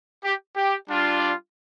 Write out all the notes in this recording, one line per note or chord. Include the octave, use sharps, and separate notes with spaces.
G4
G4
G3 D4 F4
D5